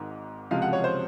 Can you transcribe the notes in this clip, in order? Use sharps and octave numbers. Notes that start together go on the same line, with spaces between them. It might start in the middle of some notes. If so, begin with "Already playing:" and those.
Already playing: G#1 G#2 D#3
C#2 C3 F3 G#3 F5
F#5
C#5
C5